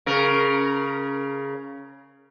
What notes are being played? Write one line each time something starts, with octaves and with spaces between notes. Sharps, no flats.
C#3 A#4